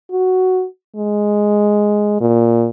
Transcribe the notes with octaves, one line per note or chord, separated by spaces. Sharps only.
F#4
G#3
A#2